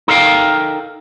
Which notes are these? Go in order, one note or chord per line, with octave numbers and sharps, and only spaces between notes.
D#4 A4 A#4 F5 G5